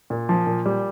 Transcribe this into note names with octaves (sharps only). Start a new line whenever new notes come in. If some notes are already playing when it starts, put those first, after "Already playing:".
A#2
F3
A#2
G3